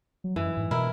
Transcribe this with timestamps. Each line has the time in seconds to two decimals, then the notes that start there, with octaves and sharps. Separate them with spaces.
0.24 F#3
0.36 F#2 E3
0.57 G#2
0.71 B2 E4 A#4